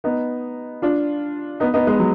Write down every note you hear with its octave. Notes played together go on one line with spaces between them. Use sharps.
B3 D#4
D4 F4
B3 D#4
B3 D#4
G#3 B3
F#3